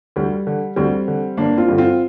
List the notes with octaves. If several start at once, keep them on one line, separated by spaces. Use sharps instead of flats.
D2 G3
D3
D2 G3 C4
D3
G1 A#3 D4
C4 F4
G2 D3
C4 F4